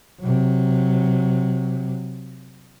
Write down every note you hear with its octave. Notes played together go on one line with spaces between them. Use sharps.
C3 F#3